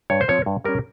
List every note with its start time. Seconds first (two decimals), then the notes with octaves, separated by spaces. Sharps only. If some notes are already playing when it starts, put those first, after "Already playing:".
0.10 G2 C#5
0.21 C5
0.28 F3 C4 C#5
0.46 G2
0.64 G3 C#4 A#4